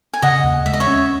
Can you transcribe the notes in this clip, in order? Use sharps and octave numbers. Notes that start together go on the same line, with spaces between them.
G#5
C#3 D#5 F#5
D#2
G#3 E5
D#5
C#5 E5
C#4